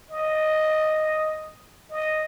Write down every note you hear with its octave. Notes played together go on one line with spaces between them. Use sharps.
D#5
D#5